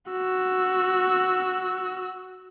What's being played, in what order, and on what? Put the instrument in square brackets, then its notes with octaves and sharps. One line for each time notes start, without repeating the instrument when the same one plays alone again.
[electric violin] F#4 E6